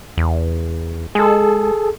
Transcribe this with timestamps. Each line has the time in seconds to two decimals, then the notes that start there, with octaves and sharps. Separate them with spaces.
0.18 E2
1.15 G#3 G#4 A4